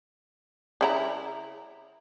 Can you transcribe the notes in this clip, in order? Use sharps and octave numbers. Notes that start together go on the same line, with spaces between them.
C#3 E4 A#5